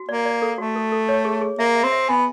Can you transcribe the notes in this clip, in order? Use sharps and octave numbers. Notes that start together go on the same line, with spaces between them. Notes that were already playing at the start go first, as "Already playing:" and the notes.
Already playing: F#4
A#3 D5
D5
A4
A3 F#4
A4
A4
C#5
G#4
G#4
A#3 E5
E5
C4
E5
B3 G#5